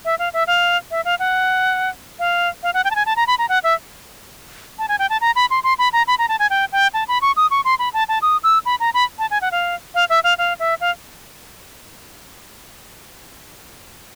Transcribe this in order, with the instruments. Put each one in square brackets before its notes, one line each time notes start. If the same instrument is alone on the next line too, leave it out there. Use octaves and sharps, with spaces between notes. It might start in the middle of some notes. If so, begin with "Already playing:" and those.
[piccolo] E5
F5
E5
F5
E5
F5
F#5
F5
F5
F#5
G5
A5
G#5
A5
A#5
B5
A#5
F#5
E5
A5
G#5
G5
A5
A#5
B5
C6
C6
B5
A#5
B5
A#5
A5
G#5
G5
G5
A5
B5
C#6
D#6
C#6
C6
B5
A5
A5
D#6
E6
B5
A#5
B5
A5
G#5
F#5
F5
F5
E5
F5
F5
E5
F5